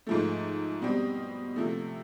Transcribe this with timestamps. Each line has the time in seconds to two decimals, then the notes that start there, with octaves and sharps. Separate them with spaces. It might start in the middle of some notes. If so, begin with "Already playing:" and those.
0.07 G#2 F3 A3
0.82 B2 G3 C4
1.56 C3 F3 A3